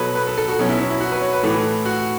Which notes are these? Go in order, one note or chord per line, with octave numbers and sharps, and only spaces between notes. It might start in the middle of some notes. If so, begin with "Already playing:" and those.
Already playing: B2 F#3 A4 B4 C#5
B4
A4
A4
F#4
B2 F#3 C#4
E4
C#4
E4
F#4
B4
C#5
B4
A2 E3 A4
F#4